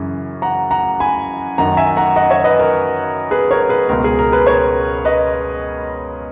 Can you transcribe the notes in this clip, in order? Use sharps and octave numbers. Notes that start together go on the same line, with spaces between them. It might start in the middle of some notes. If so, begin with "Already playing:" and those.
Already playing: F#2 C#3 E3
F#5 A#5
F#5 A#5
G#5 B5
F#2 D#3 F#5 A#5
E5 G#5
F#5 A#5
D#5 F#5
C#5 E5
B4 D#5
A#4
G#4 B4
A#4 C#5
G#4 B4
C#2 B2 A#4
G#4
A#4
G#4 B4
A#4 C#5
B4 D#5